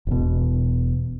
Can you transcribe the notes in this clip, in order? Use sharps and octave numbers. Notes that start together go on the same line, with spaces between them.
E1 B2